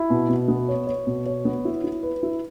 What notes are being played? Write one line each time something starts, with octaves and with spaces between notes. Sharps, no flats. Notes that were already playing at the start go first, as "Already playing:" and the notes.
Already playing: E4
B2
B2
B3
C#5
C#5
B2
C#5
B3
E4
E4
B4
E4